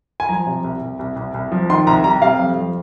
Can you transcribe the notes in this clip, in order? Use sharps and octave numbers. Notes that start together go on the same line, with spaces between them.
G#5
F3 A#5
C3
C2
C2
C2
C2
C2
F3
D#3 C6
C2 A#5
G3 A#5
C3 F5
F2
F3